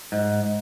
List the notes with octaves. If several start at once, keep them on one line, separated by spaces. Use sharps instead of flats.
G#2